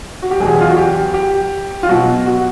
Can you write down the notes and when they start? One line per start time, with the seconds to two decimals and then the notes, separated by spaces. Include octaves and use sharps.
0.22 F#4
0.31 G4
0.40 E2 B2 F#3 G#4
0.61 F4
0.70 F#4
0.77 G4
1.14 G4
1.83 F4
1.88 B2 F#3 F#4
2.26 F#4